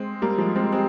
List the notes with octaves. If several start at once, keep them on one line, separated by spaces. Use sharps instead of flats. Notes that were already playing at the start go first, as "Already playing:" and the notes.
Already playing: G#3 C4
G3 A#3
F3 G#3
G#3 C4
G#3 C4